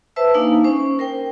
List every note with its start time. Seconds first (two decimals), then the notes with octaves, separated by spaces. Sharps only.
0.16 B4 C5 E5 A5 E6
0.34 A#3 D4 D#4 F5 G#5
0.64 C#4 C5
0.99 A#4 C5 G5